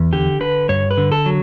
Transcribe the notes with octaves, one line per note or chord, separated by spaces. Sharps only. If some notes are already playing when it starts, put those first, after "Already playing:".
Already playing: E2
D3 G4
D3 B4
G2 C#5
B4
D3
A4
F#3